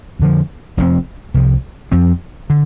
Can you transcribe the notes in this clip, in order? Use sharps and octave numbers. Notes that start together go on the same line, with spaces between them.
F2 D3 F3
F1 F2 F3 C4
C2 C3 F3
F2 F3 C4
D3